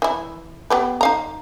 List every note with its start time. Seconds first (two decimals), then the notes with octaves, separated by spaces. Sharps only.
0.02 E3 E4
0.70 B3 G4 B4
1.01 D#4 F5 A#5